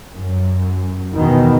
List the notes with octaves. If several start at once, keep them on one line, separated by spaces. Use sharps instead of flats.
F#2
E2 B2 D#3